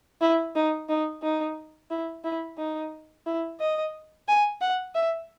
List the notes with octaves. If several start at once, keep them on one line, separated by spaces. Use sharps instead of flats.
E4
D#4
D#4
D#4
E4
E4
D#4
E4
D#5
G#5
F#5
E5